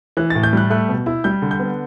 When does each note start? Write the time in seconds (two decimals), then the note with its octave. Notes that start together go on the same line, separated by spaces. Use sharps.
0.17 E3 F#6
0.30 A2 A6
0.43 G6
0.53 G3 F#6
0.70 A3 F#6
0.89 B2
1.06 E4
1.24 G3 G6
1.42 D3
1.51 G6
1.59 B3